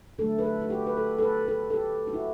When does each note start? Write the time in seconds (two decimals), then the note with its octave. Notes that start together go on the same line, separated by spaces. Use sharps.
0.18 D3 F#3 A3 A4
0.39 B4
0.44 A4
0.61 F#4
0.70 G4
0.87 B4
0.97 A4
1.18 A4
1.22 B4
1.48 A4
1.70 A4
1.74 G4
2.07 F#4
2.13 E4